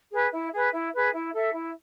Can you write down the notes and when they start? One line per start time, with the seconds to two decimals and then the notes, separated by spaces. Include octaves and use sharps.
0.11 G#4 B4
0.31 E4
0.52 G#4 B4
0.72 E4
0.92 G#4 B4
1.13 E4
1.33 A4 E5
1.53 E4